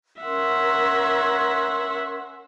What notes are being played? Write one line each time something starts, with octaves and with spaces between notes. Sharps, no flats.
C#4 A#4 E5 F#5 C6